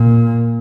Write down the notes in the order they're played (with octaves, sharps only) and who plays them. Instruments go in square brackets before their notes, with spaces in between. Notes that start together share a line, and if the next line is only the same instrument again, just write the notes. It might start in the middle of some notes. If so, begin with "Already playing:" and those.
Already playing: [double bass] A#2